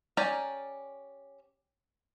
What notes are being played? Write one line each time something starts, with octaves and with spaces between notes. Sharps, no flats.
C#4 G4 D5 G#5 A#5